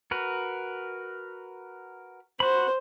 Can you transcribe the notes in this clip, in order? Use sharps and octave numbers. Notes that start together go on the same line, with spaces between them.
F#4 A#4 B4
F#4 C5 B5